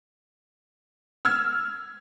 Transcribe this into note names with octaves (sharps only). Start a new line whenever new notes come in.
E6 F6 G#6